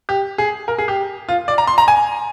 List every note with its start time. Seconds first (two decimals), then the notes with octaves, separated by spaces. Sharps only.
0.09 G4
0.38 G#4
0.68 A#4
0.78 G#4
0.88 G4
1.29 F4
1.48 D5
1.58 A#5
1.67 C6
1.78 A#5
1.88 G#5